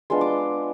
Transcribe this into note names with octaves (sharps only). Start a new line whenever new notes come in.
G#3 B3 D4 F4 C6
D6